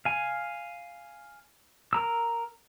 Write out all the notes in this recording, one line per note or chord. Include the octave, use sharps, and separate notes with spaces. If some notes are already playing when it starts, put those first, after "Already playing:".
F5 G#5
A#4 A#5 E6